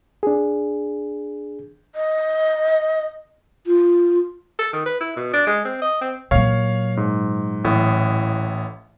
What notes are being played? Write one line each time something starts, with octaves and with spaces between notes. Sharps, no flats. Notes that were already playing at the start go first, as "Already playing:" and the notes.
D4 G#4
D#5
F4
A4
D#3
B4
E4
B2
D4
G#3
C4
D#5
C4
A#2 F#3 C#5 F5
G#2
A1 A2